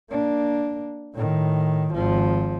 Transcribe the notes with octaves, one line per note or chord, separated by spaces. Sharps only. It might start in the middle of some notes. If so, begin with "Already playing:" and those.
A#3 D4
A2 D#3
G#1 F3